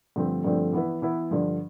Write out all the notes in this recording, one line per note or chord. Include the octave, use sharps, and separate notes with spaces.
G2 D3 F3 A3 C4
G2 D3 F3 A3 C4
E3 B3 E4 B4
E3 B3 E4 B4
G2 D3 F3